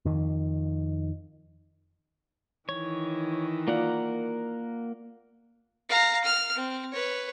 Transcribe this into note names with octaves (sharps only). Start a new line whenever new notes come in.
F2 D#3
D#3 E3 C#5
A#3 F4 A#4 D5 F5 F#5
F5 A#5
F6
C4
B4 C#5